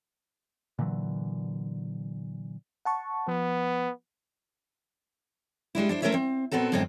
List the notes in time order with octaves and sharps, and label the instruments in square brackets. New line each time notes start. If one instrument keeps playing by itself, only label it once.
[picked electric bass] A#2 D3 E3 F#3
[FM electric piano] F#5 A5 C#6
[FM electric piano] F3 [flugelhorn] B3
[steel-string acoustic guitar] G3 G#3 D4 E4
D4 E4 C5
A3 C#4 A#4 C5 C#5 E5
C4
A#2 B3 C4 F#4 A4
F#2 A2 D3 G#3 C4